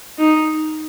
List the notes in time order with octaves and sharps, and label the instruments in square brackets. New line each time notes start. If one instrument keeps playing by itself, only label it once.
[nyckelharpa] D#4